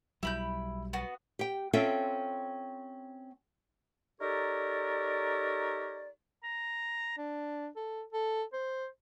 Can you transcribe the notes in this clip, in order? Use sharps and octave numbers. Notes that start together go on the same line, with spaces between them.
B1 F#3 G3 E4 B5 G6
B3 F#4
G4 G5
C4 C#4 F4 A4 E5 G5
D#4 G4 A4 A#4 C#5 D5
A#5
D4
A4
A4
C5